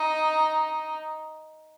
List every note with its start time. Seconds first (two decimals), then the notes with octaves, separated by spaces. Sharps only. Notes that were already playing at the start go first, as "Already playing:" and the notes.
Already playing: D#4